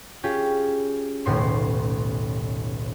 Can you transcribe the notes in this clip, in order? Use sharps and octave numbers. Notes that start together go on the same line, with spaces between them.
C#4 F4 G4 G#4
D#1 B1 A2 C6